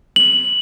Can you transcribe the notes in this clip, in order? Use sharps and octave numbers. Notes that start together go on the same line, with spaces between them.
F#7